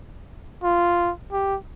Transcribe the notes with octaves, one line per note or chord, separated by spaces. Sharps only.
F4
G4